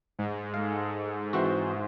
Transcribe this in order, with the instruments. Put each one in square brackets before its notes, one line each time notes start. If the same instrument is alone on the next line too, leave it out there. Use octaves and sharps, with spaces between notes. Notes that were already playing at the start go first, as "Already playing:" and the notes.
[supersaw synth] G#2
[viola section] G#3 A4 [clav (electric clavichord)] F5
[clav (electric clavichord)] E3 C4 F#4 [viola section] C5